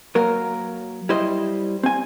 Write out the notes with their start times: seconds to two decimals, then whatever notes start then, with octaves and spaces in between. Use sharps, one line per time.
0.15 F#3 A#3 A#4
1.09 G3 E4 C5 D#5
1.83 C4 G#5